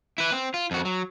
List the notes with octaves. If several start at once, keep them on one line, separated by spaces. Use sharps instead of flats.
E4 B4
C4
F4
F2 F#4
F#3